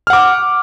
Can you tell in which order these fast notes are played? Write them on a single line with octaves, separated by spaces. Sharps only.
F6 F#5 D6